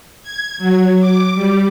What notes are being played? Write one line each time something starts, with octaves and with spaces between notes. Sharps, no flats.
G#6
F#3
D6
G3